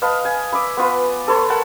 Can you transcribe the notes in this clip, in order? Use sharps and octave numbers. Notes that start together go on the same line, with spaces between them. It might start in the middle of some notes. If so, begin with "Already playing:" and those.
B4 D#5 F5 A5
G#5
D5 E5 B5
B3 F4 B4
A4 B4 C#5 C6
A#4 F#5 A5